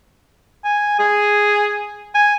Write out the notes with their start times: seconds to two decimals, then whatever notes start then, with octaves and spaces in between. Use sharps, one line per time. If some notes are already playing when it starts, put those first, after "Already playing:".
0.64 G#5
0.99 G#4
2.15 G#5